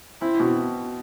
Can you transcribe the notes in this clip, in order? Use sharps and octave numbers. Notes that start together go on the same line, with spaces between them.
C4 E4
B2